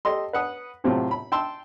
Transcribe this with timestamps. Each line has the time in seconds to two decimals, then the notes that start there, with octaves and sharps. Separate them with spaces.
0.05 G4 A4 D#5 C6
0.33 B4 F#5 D#6
0.84 A2 C3 F#3 C4 F4 G4
1.11 B5
1.32 G5 A5 C6 E6